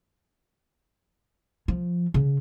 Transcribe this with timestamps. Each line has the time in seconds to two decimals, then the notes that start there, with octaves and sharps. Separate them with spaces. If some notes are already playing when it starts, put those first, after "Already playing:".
1.68 F3
2.14 C#3